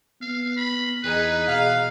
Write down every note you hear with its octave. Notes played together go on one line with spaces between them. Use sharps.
B3 F5
B5
E2 D#4 G#4 B4
B2 F5